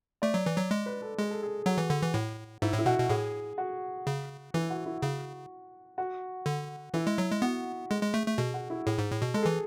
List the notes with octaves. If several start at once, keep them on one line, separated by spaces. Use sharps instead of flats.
A3 D5
F#3
E3
F#3
G#3
B4
A4
G#3 G#4
A4
G#4
F#3 F#4
E3
D3
E3
A2
G#2 E4
A2
E4
B2 F#4
B2
A2 G#4
F#4
C#3
E3 E4
F#4
E4
C#3 F#4
F#4
D3
E3 E4
G#3
F#3
G#3
B3 F#4
G#3 G#4
G#3
A3
A3
B2 G#4
F#4
E4
A2 G#4
G#2
A2
B2
G#3 A4
E3 G#4